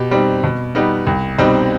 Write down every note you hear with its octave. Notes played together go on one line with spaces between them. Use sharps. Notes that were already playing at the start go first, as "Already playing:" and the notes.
Already playing: B2 G4
G3 C4 D#4
B2
G3 B3 D#4
C2
B2 G3 C4 D#4